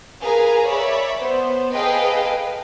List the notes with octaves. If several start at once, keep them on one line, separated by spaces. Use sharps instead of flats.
G#4 A#4 B4 F5 G#5 A#5
C#5 D5 E5 B5
B3 C5
G#4 A4 B4 D#5 F5 G5